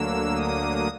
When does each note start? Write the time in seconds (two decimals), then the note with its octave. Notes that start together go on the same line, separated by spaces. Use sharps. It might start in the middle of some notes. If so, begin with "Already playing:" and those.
Already playing: D2 D3 F#3 A#3 E6
0.35 D#6